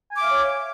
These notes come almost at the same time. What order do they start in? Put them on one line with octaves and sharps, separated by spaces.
G#5 D6 E5 F5 C#5